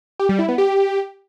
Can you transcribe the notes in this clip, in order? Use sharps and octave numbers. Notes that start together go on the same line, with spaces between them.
G4
G3
E4
B3
G4